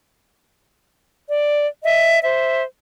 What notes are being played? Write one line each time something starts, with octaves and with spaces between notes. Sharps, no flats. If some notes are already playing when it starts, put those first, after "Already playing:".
D5
D#5 E5
C5 E5